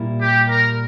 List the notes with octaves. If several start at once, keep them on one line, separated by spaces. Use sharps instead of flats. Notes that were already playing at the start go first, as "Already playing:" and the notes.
Already playing: A#2 G3 A#3 E4
G4
A#4